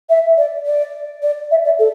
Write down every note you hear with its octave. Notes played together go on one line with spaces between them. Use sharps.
E5
D5
D5
D5
E5
D5
A4